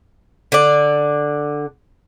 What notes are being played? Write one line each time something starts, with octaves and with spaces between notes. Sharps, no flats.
D3 D5